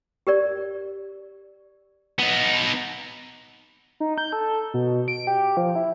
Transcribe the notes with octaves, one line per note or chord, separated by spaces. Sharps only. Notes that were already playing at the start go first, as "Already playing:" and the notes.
G4 A#4 D5
B3 D#4
D#4
G6
A4
B2
D7
G4
F3
E4